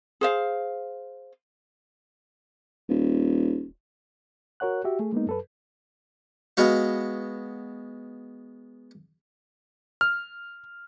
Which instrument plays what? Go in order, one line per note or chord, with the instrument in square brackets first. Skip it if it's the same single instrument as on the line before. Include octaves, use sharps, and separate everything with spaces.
[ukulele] G#4 C5 F5
[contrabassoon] D#1
[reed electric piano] F#4 A#4 C#5 F#5 F#6
F#4 G4 E5
A3 G#4
G#3 A#3 B3 D#4
F#2 A4 B4
[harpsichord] G#3 B3 F#4 F5
[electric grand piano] F6